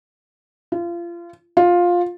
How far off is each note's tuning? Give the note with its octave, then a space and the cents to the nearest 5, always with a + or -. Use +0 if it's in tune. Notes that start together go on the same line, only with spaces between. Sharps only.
F4 -30
F4 +10